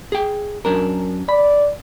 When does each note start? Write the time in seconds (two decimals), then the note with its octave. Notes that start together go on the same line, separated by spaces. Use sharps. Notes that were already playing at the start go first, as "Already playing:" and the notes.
0.12 G#4 G5
0.65 F#2 D4 A#4
1.29 D5 B5